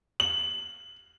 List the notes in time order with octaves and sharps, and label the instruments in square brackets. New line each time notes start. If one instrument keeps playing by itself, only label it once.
[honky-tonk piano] F#7